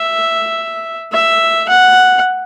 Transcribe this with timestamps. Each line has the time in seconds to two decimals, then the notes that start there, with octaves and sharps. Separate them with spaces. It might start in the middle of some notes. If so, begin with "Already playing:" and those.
Already playing: E5
1.13 E5
1.69 F#5